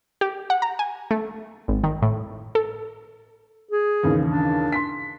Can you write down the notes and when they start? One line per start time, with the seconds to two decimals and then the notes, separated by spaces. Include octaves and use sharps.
0.21 G4
0.50 F#5
0.62 A#5
0.79 G#5
1.11 A3
1.68 G#1
1.84 D#3
2.02 A2
2.55 A4
3.71 G#4
4.03 D#2 C#3 E3
4.27 D4
4.72 C6 B6